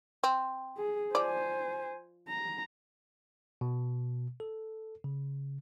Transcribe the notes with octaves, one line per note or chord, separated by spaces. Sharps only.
C4
G#4
F3 C5 D5 G#5
A#5
B2
A4
C#3